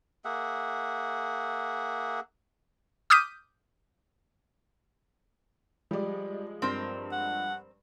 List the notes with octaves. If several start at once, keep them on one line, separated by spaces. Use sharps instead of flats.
A#3 G#4 E5 F#5
D6 D#6 F6 G6 B6 D#7
F3 G3 G#3 D5
G2 C4 A#4 C5
F#5